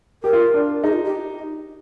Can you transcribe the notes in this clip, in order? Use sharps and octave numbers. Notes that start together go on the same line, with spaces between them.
G4 A#4
F4
D4
D#4 G#4
F4
G4